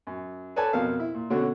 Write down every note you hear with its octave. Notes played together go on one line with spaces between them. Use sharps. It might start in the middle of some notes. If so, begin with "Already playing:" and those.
F#2
A4 B4 C#5 D5 G#5 A5
F2 B2 A#4 F5
E4
A#2
B2 D3 C#4 F#4